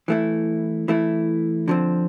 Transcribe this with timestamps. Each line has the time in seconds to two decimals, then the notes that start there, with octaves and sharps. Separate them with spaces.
0.08 E3 A3 E4
0.88 E3 A3 E4
1.68 D3 F3 C4